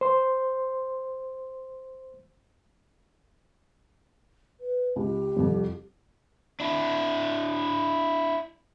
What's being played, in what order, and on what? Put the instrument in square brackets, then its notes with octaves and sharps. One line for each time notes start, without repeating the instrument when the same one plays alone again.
[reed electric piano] C5 C6
[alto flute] B4
[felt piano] C#2 [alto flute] G4
[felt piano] C2 F2
[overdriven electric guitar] D4 E4